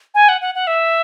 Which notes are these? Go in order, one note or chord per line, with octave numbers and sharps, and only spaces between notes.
G#5
F#5
F#5
F#5
E5